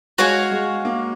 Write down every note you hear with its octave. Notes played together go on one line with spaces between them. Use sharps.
G#3 F#4 C#5 F5 G#5
G#3
A#3